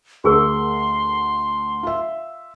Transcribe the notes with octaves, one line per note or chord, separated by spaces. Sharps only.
D2 G4 G#4 A#4 C6
F4 E5